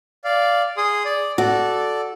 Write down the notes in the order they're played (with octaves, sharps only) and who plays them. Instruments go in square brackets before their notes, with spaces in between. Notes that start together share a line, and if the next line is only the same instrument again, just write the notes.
[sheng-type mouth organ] D5 F5
G#4 C6 D#6
D5
[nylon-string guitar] F#4 [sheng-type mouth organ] A4 D5